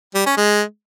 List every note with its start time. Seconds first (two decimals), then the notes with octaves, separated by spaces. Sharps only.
0.15 G3
0.26 C#4
0.37 G#3